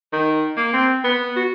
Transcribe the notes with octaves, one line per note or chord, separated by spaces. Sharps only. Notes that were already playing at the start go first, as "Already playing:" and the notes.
D#3
A#3
C4
B3
F#4